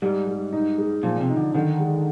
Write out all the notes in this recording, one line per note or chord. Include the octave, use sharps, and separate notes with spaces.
G#2 G3
G3
D#4
G#3
A#2 F3
C3
D#4
D3
D3 D#3
G#3